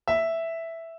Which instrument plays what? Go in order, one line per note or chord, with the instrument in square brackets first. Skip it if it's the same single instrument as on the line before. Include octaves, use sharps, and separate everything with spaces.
[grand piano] E5